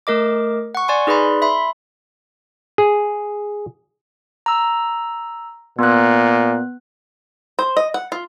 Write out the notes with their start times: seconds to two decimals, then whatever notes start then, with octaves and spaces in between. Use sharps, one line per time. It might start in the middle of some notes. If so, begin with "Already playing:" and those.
0.07 A3 A#4 D#5 D6
0.75 F#5 C#6
0.88 D5 G#5 C6
1.07 D#4 G#4 B4 D5 B5 C6
1.42 E5 B5 C6
2.78 G#4
4.46 A#5 E6
5.79 A#2 B3 F#6
7.59 C5
7.77 D#5
7.94 F#5
8.12 F4